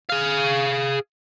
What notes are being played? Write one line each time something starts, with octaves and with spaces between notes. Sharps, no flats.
G#4 F5